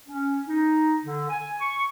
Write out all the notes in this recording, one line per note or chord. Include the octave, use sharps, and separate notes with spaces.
C#4
D#4
D3
G#5
C#6